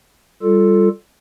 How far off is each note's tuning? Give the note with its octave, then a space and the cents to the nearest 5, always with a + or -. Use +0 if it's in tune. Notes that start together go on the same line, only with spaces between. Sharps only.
G3 +0 F4 +0 A4 +0